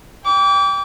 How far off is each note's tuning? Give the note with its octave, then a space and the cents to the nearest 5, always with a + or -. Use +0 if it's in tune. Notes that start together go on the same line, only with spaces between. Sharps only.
G5 +15 D6 -35